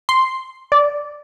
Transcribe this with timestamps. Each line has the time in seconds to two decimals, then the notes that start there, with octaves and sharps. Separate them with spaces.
0.09 C6
0.72 D5